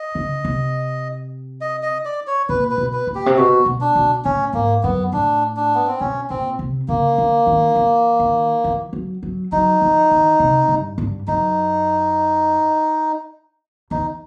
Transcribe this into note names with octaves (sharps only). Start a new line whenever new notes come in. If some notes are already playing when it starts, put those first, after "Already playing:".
Already playing: D#5
C#3
C3
D#5
D#5
D5
C#5
A#2 B4
B4
B2
B4
A#2
G4
C3
B2 F#4
B2
D4
B2
A2 C#4
G#2 A#3
F#2 B3
A2 D4
D4
B3
C4
B2 C#4
A#2 C4
C3
C#3 A#3
D3
D#3
E3
D#3
E3
F#3
F#3
F#3 D#4
F3
D#3
C3
G2
G2
F#2 D#4
E2 D#4